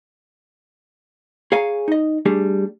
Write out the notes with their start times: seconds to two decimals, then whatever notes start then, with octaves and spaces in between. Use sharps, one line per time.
1.52 G#4 C#5 F5 G#5 A#5
1.88 D#4 D#5
2.26 G3 A3 D4 G4 G#4